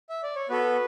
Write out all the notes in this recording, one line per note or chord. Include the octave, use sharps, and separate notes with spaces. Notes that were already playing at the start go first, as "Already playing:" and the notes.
E5
D5
C#5
B3 F#4 A4 B4